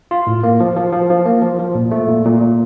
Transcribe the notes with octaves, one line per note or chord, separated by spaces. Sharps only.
F4
A2
A#3
F3
F3
F3
F3
A#3
F3
F3
A#2
A3
A#2
A#2
A#2